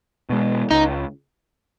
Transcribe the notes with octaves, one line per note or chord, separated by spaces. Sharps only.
B2 G#3
C#2 D#4